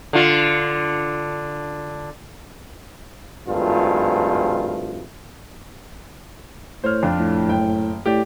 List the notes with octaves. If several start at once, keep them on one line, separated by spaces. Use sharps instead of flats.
D3 F4
G#1 G2 F3 A3 F4
A2 C5 C#5 F6
F2 D4 F4
A2
F#1 G5
A2 G4 D5